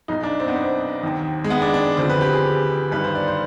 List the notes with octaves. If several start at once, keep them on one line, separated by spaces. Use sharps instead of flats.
B1 B2 D#4
D4
C4
B3
C4
D#2 D#3
G#3
B3
D4
D4
D2 D3 F3 C4
B4
G4
G#4
G1 G2 D#3 B4
C5
D5
C5